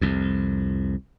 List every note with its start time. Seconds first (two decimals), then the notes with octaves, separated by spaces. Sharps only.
0.01 C2 F2